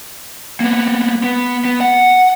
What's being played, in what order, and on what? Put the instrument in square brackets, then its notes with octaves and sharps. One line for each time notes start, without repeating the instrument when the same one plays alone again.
[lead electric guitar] A#3 B3
B3
B3
F#5